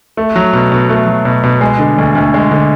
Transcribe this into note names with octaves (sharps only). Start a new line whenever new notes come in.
A3
F#3
B2
B2
A3
F#3
B2
B2
G#3
D3
D2
D2
G#3
D3